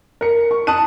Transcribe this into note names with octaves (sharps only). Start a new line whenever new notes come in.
A#4 C#7
C#6
A5 D#6 F#6 D#7